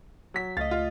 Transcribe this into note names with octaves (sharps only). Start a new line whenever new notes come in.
F#3 B6
C#2 A3 D#5 F5 A6
F4